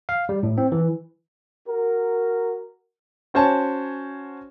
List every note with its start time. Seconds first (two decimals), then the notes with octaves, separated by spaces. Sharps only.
0.09 F5
0.29 G3
0.43 A2
0.58 C4
0.72 E3
1.68 F#4 A#4
3.34 C#4 F#4 C5 C#5 G#5 A5